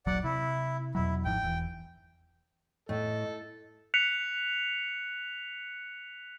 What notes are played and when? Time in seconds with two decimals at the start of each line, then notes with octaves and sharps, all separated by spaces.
0.06 D#1 A#1 F#3 D5 F#5
0.24 C3 E4
0.95 E2 B2 F#3 E4
1.25 G#1 G#2 F3 G5
1.43 E1 E3
2.89 A2 A4 D#5
3.94 F#6 B6 C#7 F7